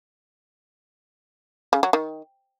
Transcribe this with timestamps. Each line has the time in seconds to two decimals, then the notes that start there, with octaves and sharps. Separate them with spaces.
1.73 C#3
1.83 F#3
1.93 D#3